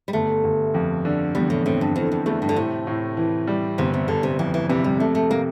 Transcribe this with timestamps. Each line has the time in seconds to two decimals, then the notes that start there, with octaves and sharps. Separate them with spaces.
0.08 G3
0.13 G1 A3
0.44 G1
0.74 F2
1.05 D3
1.35 E2 G3
1.50 A2
1.66 A2 C4
1.81 G2
1.96 F2 E3
2.12 F2
2.26 E2 A3
2.42 G2
2.49 D3
2.56 A2 C3
2.87 A2
3.17 E3
3.47 G3
3.78 G1 C3
3.94 C3
4.08 G1 D3
4.23 C3
4.39 F2 E3
4.54 E3
4.69 C3 E3
4.84 G3
5.00 C3 A3
5.15 A3
5.30 C3 A#3